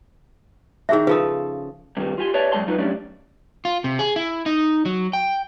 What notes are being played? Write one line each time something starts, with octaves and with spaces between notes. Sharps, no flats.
D#3 C4 D4 G#4 E5
C#3 F3 A4 B4 D#6
G2 C3 D#3 F3 G3 C4
F4 G4 G#5 C6
G4 B4 C#5 D5 E5 A5
A#2 F#3 G#3 D5 A5 C6
F3 F#3 D#4 F4 G#4 B4
F#3 G3 A3 C#4 D4 D5
F4
C3
G#4
E4
D#4
F#3
G5